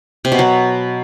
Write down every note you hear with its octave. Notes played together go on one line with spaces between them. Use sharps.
C3
B2
F#3